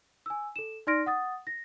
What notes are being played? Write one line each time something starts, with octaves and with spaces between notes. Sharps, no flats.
G#5 E6
A4 E7
D#4 D5 C6 F6 A#6 D7
F#5 D#6 A6
A#6